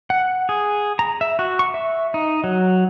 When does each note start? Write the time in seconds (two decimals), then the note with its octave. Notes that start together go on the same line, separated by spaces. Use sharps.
0.10 F#5
0.49 G#4
0.99 A#5
1.21 E5
1.39 F#4
1.59 C#6
1.74 E5
2.14 D#4
2.44 F#3